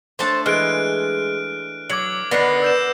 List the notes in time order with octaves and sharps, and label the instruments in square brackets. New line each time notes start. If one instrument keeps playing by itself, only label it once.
[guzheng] A3 D4 A4 [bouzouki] C5 A5
[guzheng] E3 [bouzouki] G#3 [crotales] F6 F#6 D7
[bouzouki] F#3 [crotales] D6 G#6 F#7
[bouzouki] D3 D#3 D4 [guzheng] B3 [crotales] A#6 C7
[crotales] E6 G6 E7